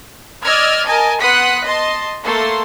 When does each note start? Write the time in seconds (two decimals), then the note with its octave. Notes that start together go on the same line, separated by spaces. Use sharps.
0.44 D5 D#5 E6 F6 G#6
0.86 A#4 D#5 G#5 A5
1.20 B3 F#5 C6 D#6 F#6 B6
1.65 D#5 A5 C6
2.25 A3 A#3 A4 C6